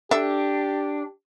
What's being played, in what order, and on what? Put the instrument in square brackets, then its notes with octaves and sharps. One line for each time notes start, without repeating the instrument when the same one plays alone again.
[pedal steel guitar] D4 [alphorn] G4 [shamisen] A4 E5